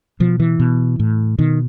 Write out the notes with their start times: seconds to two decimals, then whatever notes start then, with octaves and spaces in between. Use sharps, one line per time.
0.20 B2 F3
0.40 E3
0.60 B2
1.00 A2
1.39 B2 D#3